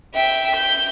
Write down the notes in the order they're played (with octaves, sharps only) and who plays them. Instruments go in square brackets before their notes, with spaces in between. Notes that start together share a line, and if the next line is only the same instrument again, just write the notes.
[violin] E5 G5
G6